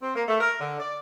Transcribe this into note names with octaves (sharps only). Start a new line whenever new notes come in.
C4
A#3
A3
A#4
D3
D5